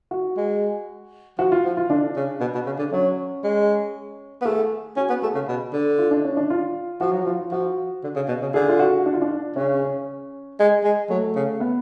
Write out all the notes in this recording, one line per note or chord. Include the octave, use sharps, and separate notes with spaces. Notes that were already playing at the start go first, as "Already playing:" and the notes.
F#4
G#3
F3 F#4
F4
F3
F4
D3 D4
C#3
B2
B2
C#3
D3
F#3 C#4
G#3
B3
A3 G#4
C#4 F#4
B3
A3 G#4
C#3
B2
D3
F4
D4
C#4
D4
F4
F3 F#4
F#3
F3
F4
F3 F#4
D3
C#3
B2
C#3
D3 G#4
F4
F#4
D4
F4
D4
C#3 C#4
C#4
G#3
G#3
F#3 A3
C#3
B3